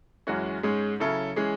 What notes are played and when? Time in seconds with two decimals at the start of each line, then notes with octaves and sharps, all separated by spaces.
0.27 F#2 E3 G#3 C#4 F#4
0.63 G#2 G#3 C#4 G#4
1.00 C#3 F#3 C#4 E4 A4
1.36 E3 G#3 C#4 G#4